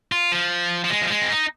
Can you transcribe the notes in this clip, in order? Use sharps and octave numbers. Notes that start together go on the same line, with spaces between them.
F4
F3
F3
G#3
F3
G#3
C4
D#4